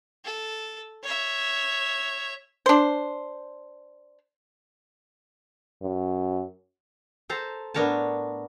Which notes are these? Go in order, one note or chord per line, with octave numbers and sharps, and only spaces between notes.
A4
C#5 E5
D4 C5
F#2
A4 C5 A5 A#5
A2 B3 D4 A#4 C#5 A5